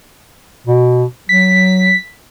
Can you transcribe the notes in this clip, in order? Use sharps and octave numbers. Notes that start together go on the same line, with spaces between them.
B2
F#3 B6